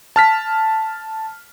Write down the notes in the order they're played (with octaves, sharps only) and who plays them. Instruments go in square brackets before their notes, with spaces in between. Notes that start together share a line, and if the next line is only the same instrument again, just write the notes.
[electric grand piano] A5 F6 B6